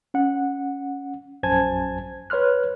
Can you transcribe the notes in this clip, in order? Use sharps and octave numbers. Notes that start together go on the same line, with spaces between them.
C#4 F#5
A#1 F#2 C5 G#5 A5 G#6
B4 C#5 C6 F6 F#6